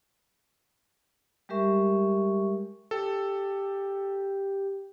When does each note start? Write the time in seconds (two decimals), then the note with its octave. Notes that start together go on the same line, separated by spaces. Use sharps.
1.49 G3 G#3 G4 A#4 E5 C#6
2.91 G4 A4